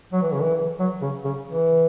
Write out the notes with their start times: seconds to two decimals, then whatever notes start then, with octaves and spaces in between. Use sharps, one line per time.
0.13 F#3
0.22 E3
0.33 C#3
0.42 E3
0.80 F#3
1.02 C#3
1.24 C#3
1.47 E3